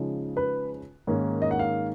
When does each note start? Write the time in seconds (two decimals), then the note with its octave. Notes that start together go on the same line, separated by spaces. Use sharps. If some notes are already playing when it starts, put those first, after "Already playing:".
Already playing: C#3 F3 G#3 D#4
0.37 B4
1.07 G#2 D#3 A#3 C#4
1.42 D#5
1.51 F#5
1.59 F5